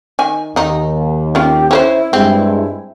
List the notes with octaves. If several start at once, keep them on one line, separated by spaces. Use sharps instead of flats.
D#3 G#5
D#2 D#3 D#4
C#4 F4 G4
C#4 E4 B4 C5
G2 G#3 C4